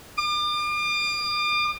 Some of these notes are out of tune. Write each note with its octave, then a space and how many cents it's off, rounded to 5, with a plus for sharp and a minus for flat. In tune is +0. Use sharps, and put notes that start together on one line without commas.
D6 +40